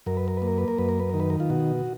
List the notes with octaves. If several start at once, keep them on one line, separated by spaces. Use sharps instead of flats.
F#2 A#4
B4
A#4
A#3 B4
A#4
B4
A#4
F#2 B4
A#4
B4
D#3 A#4
B4
A#4
F4
B2 F#4